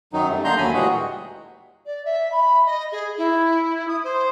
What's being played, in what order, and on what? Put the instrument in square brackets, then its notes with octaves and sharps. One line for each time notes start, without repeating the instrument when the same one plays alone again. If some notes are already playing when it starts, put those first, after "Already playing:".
[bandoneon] F#2 D#3 F#3 D#4
G3 A3
D3 A#3 D4 A#5 C6 G6
D#2 D3 F#3 A3 G#5 B5
A#2 E3 G3 G#3 F#4 G#4
[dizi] D5
E5
B5
D#5
G#4
E4
D#6
C5